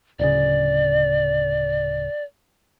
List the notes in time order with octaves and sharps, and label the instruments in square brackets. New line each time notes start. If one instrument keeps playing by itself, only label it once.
[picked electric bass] D1 C#3 [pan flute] D5